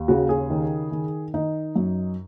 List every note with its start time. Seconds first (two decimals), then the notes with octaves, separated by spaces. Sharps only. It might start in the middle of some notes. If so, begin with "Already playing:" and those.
Already playing: D#2
0.08 C#3 F#4
0.29 G#4
0.50 D#3
0.92 D#3
1.34 D#3 D#4
1.76 F#2